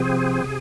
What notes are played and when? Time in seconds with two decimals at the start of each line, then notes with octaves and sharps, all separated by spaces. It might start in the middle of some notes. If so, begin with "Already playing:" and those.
Already playing: C3 F3 C4 G#4
0.44 C3